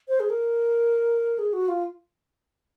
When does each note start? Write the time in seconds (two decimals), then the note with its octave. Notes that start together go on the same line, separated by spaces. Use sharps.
0.08 C5
0.20 G#4
0.30 A#4
1.38 G#4
1.53 F#4
1.68 F4